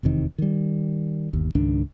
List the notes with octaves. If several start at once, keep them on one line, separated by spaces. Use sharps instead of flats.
F1 E2 C3 D#3
D#3 G3
G1 D#2
C#2 G#2 D#3 D4